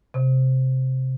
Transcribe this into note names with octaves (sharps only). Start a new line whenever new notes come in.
C3